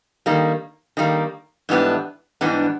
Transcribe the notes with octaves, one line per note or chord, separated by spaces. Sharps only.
D#3 G3 A#3
D#3 G3 A#3
G#2 E3 G3 B3 D4
G#2 E3 G3 B3 D4